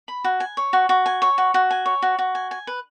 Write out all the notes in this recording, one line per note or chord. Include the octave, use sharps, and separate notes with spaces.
B5
F#4
G#5
C#5
F#4
F#4
G#5
C#5
F#4
F#4
G#5
C#5
F#4
F#4
G#5
G#5
B4